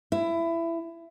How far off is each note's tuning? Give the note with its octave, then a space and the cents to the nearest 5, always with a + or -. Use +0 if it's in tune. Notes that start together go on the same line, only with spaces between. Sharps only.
E4 +20